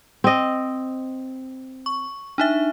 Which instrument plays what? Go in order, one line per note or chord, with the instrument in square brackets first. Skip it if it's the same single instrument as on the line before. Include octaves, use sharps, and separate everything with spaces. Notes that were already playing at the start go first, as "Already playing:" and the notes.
[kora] C4 D#5
[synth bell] C#6
D4 D#4 E5